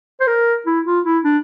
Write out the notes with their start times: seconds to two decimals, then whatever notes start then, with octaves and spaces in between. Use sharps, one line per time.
0.21 C5
0.27 A#4
0.67 E4
0.86 F4
1.05 E4
1.25 D4